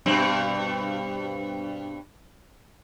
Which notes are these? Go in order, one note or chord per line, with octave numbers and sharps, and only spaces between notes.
G2 B2 C4